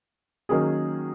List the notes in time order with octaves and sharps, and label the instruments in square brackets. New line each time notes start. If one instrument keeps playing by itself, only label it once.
[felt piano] D#3 F#3 A#3 C#4 G#4